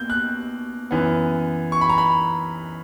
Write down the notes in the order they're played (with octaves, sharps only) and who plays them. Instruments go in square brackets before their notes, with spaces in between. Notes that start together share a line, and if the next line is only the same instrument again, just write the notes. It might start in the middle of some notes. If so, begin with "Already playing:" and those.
Already playing: [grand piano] B2 A#3 G6
F#6
F#2 E3 B3
C#6
B5
A#5
B5